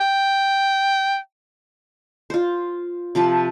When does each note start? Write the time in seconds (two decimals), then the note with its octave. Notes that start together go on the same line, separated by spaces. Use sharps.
0.01 G5
2.30 F4 C5
3.15 C3 F3 B4 A5